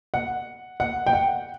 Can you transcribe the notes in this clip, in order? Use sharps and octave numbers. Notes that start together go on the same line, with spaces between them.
F#5
F#5
G5
F#5